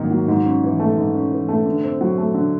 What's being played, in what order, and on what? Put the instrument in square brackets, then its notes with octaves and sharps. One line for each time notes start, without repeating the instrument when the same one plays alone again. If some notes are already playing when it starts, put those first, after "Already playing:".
Already playing: [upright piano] G#2 D#3 F#3 A#3
F#3
G#2
C#4
E3
A3
G#2
C#4
E3
A3
D3
C4
F#3
A3
D3